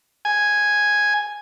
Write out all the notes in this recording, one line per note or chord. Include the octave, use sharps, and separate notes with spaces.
G#5